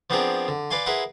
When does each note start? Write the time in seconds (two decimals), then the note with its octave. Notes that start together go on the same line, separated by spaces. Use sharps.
0.10 F3 B3 C4 D4 G#4 A#4
0.48 D3
0.71 B4 D5 F5 G#5 C6
0.86 E4 G#4 A#4 B4 F#5 C6